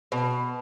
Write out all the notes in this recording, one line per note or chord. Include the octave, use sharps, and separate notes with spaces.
B2